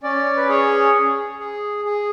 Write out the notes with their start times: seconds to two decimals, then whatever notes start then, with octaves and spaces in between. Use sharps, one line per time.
0.03 C#4 D5
0.37 B4
0.49 G#4 C#5
0.95 G#4
1.39 G#4
1.85 G#4